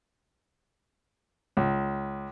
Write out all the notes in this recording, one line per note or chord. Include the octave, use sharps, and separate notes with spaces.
C#2